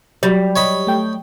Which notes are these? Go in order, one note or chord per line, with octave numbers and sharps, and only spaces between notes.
F#3 G3 F#4
C#5 D#5 B5
A3 G5